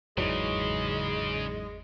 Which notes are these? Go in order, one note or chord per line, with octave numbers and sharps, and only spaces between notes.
G1 E2 G#2 C#3 E3 F#3 G#3 D5